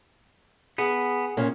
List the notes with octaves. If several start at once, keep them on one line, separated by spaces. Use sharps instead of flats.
B3 G#4
A#2 C#4